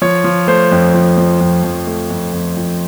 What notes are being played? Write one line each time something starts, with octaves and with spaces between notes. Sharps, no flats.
F3 C#5
F3
A3 C5
F2
F3
F3
F2
F2
A3
F2
F2
F2